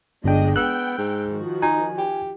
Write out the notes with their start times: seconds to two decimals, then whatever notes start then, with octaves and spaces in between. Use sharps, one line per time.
0.24 G1 G#3 D4 D#5 G5
0.56 B3 G5 E6 F#6
0.98 G#2
1.30 D#3 F3 F#4
1.62 D#4 G#5
1.98 G4